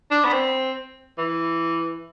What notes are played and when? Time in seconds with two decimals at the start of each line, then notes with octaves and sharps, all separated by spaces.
0.11 D4
0.25 B3
0.33 C4
1.18 E3